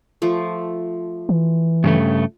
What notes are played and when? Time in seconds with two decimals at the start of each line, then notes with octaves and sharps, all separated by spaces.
0.22 F3 A3
1.29 E3
1.84 G2 C#3 A3